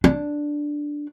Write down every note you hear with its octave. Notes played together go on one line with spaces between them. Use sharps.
D4